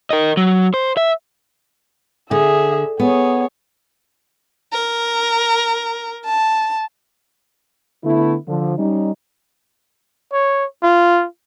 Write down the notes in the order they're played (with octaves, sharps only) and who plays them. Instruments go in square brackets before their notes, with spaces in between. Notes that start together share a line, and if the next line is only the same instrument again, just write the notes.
[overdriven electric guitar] A#4 D#5
F#3
C5
E5
[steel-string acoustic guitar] D3 [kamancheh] G#4 E5
[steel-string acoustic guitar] B3 [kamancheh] G#4 C#5
[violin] A#4
A5
[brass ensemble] D3 A3 B3 E4
D3 F3
G3 C#4 D#4
[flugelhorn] C#5
F4